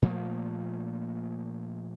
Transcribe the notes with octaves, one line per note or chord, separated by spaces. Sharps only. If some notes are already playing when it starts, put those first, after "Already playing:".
A#2 F3 A3 A#3